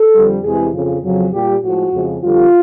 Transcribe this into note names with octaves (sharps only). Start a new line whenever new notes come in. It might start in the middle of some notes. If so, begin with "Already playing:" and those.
Already playing: A4
F2 D3 G3
E2 C3 E3 G#3 G#4
F2 C#3 F3
F2 C#3 F#3
A#2 G3 G4
A2 F3 G#3 F#4
F2 C#3 F3 G#3
F2 D3 G3 F4